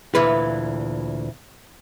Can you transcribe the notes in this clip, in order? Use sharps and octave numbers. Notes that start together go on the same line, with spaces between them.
D2 A#2 E3 B4